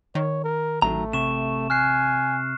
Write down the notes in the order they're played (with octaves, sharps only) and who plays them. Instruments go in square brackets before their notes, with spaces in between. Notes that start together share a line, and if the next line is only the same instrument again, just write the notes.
[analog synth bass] D#3 [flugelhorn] C#5
[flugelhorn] A#4
[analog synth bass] A1 [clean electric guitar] D#3 F#3 A#5 [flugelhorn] A3
[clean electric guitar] C3 [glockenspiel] C#6 E7
[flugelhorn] G#5 [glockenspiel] F6 F#6 C7